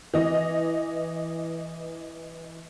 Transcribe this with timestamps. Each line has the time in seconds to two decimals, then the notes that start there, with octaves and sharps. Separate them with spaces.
0.14 E3 D#5